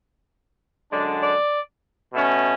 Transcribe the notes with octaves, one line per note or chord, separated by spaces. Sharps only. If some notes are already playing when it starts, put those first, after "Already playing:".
F#2 D3 G#3 D4 D5
D5
B2 A3 C#4